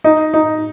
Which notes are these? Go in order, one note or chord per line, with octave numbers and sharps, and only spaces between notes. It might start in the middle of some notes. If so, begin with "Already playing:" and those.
D#4
D#4